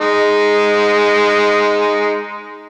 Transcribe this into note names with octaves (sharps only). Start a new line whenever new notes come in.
G#3 D#4